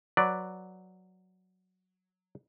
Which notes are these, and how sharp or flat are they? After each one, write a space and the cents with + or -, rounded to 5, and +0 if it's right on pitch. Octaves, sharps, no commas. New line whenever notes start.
F#3 +0 B4 +10 D5 +0